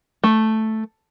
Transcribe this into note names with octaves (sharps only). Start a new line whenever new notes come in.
A3